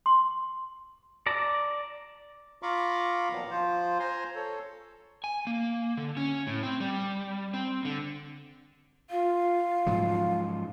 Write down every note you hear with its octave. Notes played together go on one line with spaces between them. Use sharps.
C6
D5 A5 A#5
F4 F5 A#5 B5 C#6 D6
A#2 D#3 F3 F#3 B3
F3 F4 C5
C5 G#5 A#5 C6
A4 C#5
G#5
A#3
D3
C#4
A2
C4
G3
C4
D3
F4 F5
G#2 F3 F#3